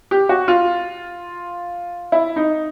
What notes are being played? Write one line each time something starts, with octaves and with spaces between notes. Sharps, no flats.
G4
F#4
F4
E4
D#4